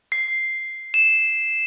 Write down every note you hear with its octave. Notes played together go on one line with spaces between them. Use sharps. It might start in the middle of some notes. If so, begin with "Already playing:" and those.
C7
E7